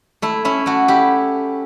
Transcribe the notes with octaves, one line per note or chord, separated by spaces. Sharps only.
A3 E4
C#4 E4
A3 F#4
E4 G4